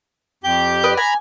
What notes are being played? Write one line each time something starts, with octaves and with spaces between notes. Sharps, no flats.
F2 G4 G6
B4 D5 D#5
G#5 A#5 B5